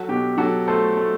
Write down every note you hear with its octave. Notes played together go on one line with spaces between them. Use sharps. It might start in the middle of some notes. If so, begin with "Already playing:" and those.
Already playing: F#3 F#4 A4
B2 G4
F#3 F#4 A4
A3 A4 C5
A3